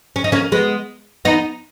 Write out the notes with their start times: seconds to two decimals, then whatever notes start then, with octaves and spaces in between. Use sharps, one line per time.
0.16 C#4
0.24 D#4
0.32 A#3 C#4
0.52 G#3 B3
1.25 B3 D#4